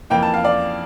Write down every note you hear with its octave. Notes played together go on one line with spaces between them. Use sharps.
F2 E3 A#3 G5
A5
F5
D5